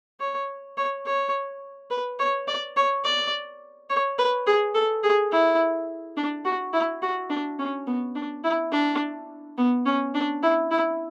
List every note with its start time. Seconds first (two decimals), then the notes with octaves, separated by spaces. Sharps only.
0.20 C#5
0.77 C#5
1.06 C#5
1.91 B4
2.20 C#5
2.48 D5
2.77 C#5
3.04 D5
3.90 C#5
4.18 B4
4.47 G#4
4.75 A4
5.03 G#4
5.32 E4
6.17 D4
6.45 F#4
6.73 E4
7.02 F#4
7.30 D4
7.59 C#4
7.87 B3
8.16 D4
8.44 E4
8.72 D4
9.58 B3
9.86 C#4
10.15 D4
10.43 E4
10.71 E4